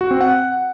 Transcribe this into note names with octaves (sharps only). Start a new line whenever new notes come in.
F#4
C4
F#5